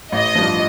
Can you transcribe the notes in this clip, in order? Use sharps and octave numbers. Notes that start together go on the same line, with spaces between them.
A1 D#5
G2 F3